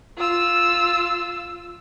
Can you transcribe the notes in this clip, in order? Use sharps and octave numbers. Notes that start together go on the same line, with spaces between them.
F4 E6